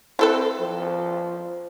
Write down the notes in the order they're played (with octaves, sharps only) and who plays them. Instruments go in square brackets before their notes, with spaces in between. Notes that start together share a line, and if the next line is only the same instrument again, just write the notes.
[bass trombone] C4 [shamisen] E4 A4 B4
[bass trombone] F3